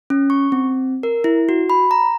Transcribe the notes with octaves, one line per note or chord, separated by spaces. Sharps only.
C#4
C#6
C4
A#4
E4
F#4
B5
A#5